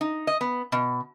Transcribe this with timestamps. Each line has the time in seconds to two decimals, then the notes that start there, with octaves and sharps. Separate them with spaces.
0.01 D#4
0.27 D#5
0.41 B3
0.72 B2